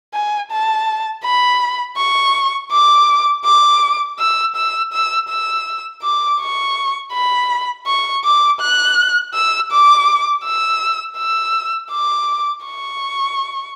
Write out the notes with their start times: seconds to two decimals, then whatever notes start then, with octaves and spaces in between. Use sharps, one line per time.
0.14 G#5
0.51 A5
1.24 B5
1.97 C#6
2.72 D6
3.45 D6
4.19 E6
4.56 E6
4.93 E6
5.29 E6
6.03 D6
6.40 C#6
7.13 B5
7.87 C#6
8.24 D6
8.61 F#6
9.34 E6
9.72 D6
10.45 E6
11.18 E6
11.92 D6
12.65 C#6